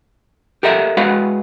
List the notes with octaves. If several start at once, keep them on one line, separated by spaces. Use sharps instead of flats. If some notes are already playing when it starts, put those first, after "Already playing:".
G4 A4 A#4 D#5 E5
G#3 F#4 B4 D#5 F5